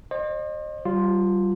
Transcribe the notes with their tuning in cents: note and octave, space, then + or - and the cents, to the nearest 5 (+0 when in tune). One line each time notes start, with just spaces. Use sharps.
C5 +40 D#5 -35
G3 -25 F4 +0